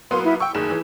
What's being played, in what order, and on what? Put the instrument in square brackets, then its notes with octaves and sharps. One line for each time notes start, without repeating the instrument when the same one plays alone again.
[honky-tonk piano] F#3 A#3 B3 [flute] C6
[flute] E4
[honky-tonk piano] G5 C#6 [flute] E6
[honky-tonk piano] F#1 D#3 E7 [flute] G#4
[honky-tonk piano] E3